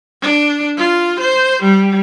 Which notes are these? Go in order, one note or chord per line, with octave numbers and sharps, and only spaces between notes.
D4
F4
C5
G3